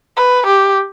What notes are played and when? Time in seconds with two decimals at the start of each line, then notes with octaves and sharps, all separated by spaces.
0.17 B4
0.46 G4